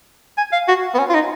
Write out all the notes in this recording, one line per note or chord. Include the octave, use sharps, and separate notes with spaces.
G#5
F5
F#4
B3
C#4
F4
D#4